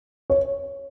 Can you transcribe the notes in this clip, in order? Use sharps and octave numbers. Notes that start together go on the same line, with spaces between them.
C#5